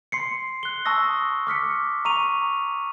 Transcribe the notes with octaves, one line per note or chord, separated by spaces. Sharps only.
C6 C7 C#7
F#6 G7
A5 C#6 D#6 E6 A#6
D6 F6 B6 C#7
A#5 C#6 D#7 F7